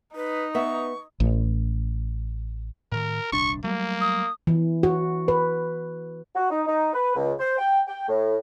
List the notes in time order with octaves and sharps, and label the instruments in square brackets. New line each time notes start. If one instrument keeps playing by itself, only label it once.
[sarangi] D#4 [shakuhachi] B4
[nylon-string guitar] B3 E5 [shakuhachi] C#6
[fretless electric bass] A1
[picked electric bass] A2 D#3 [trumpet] A#4
[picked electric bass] D#1 C2 D4 [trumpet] C#6
[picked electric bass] F#3 G3 A3 [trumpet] A#3
[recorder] D#6
[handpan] E3
F#4
B4
[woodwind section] F#4
D#4
D#4
B4
C#2
C5
G5
G5
A2